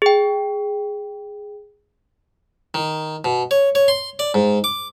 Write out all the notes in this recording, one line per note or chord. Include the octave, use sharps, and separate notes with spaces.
G#4 G5
D#3
B2
C#5
C#5
C6
D5
G#2
D6